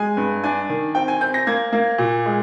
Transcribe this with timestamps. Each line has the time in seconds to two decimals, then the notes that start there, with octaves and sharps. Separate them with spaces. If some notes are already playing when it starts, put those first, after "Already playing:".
Already playing: G#3 G#5
0.17 G2
0.44 D4 G#5
0.69 D#3
0.95 C4 G5
1.08 G#5
1.21 C4 G6
1.34 A#6
1.47 A#3 G#6
1.73 A#3
1.98 A#2
2.26 G#3